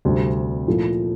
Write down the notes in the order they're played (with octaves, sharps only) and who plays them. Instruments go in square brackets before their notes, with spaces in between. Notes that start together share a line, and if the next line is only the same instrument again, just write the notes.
[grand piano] D2 C3 G3 C4
A#2 F3 A3 E4